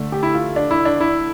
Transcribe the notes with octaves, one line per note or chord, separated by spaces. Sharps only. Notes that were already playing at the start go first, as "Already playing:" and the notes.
Already playing: D3 A3
G4
E4
F4
D4
E4
D4
E4